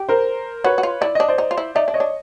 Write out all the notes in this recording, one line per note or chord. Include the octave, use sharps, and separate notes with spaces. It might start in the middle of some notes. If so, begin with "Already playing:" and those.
Already playing: G4
A#4 C5
F#4 B4 C#5
F#4
F4
E4 D5
D4 D#5
C5 D5
D#4
F4
E4
D#4 D5 E5
D4
C#5 D#5
D4